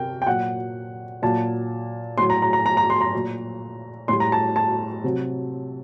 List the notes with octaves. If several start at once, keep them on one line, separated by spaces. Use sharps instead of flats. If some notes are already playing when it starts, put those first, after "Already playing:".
Already playing: C3 A#4 G5
G5
A#2 F#3 F#5
A#2 F#3 A5
A2 F#3 C6
A#5
A#5
A#5
A#5
A#5
C6
A#5
A#2 F#3
A2 G3 C6
A#5
A5
A5
C3 F#3